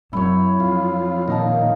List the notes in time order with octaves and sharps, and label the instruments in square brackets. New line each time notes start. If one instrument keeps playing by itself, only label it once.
[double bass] F#2 [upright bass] F#3 C4 [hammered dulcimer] E4 C#5
[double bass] F2 [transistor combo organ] F4
[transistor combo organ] A#2 D#3 [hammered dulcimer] D#5 F5 A5